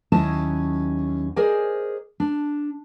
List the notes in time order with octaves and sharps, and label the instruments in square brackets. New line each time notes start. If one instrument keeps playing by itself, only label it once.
[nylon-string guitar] D#2 F#3 C#4 E4 D#5 A5
G#4 A#4 C5 D5 D#5 G#5
D4